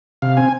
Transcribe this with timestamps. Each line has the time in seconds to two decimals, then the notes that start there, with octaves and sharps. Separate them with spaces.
0.22 C3 F5
0.37 C4 G#5